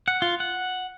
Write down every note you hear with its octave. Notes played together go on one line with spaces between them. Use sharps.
F#5
F4
F#5